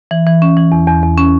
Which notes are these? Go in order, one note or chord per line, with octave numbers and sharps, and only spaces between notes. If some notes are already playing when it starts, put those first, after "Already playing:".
E3
E3
C#4
E3
E2
E2
E2
C#4